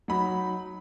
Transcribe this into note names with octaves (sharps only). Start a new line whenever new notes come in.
F#3 D#4 B5